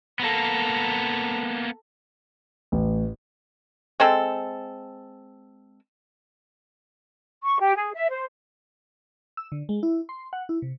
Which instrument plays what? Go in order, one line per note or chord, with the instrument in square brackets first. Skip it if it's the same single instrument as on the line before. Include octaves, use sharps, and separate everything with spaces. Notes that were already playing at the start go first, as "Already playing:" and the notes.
[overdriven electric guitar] A#3 B3 [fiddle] A4 A#5
[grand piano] A1
[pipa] G#3 C4 A4
[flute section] C#6
G4
G#4
E5
C5
[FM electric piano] E6
D3
G#3
E4
C6
F#5
E4
C3